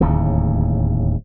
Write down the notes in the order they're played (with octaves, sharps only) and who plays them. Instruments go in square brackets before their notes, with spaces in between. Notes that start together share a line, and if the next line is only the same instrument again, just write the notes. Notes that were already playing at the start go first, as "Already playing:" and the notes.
[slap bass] D1 D#2 A2 C#3